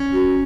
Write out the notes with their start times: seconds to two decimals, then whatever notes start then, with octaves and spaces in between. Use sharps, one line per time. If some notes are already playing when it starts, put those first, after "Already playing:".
Already playing: C#4
0.13 F#4